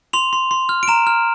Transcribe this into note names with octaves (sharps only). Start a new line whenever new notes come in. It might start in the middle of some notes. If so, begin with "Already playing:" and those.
C6 F7
C6
C6
F6
D7
A#5 E7
F6